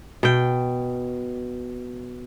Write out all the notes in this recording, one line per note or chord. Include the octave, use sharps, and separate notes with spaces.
B2 G5